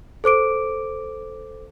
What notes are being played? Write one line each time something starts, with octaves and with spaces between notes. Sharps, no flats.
A4 C5 D6 D7